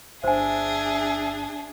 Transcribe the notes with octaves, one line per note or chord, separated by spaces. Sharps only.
G1 D4 G#4 C5 E5 G#5